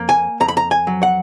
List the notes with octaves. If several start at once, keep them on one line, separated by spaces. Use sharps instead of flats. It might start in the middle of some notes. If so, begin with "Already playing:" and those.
Already playing: F2 A#3
G#5
F2 A#5
B5
A#5
G#5
F#3
F#5